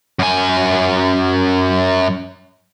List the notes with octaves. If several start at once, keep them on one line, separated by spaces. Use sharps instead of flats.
F#2 G#5